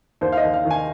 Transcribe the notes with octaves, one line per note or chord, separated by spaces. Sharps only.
D#2 C5
F5
D#5
D#2
F5
D#3
G#5